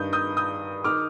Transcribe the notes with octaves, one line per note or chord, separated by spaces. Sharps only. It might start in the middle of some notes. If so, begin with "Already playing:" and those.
Already playing: G2 D#3 D#6 G6
D#6 G6
D#6 G6
D#3 D6 F6